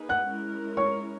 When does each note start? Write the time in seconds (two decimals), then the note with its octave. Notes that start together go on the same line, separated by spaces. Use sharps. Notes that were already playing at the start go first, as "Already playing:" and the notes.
Already playing: A#3 D#4 G#4 B4
0.09 F#5 F#6
0.26 G#3 C#4 E4 A#4
0.77 C#5 C#6